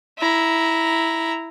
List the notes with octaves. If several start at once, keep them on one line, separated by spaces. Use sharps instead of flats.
E4 A#5